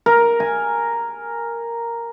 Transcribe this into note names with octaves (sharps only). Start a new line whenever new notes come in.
A#4
G#5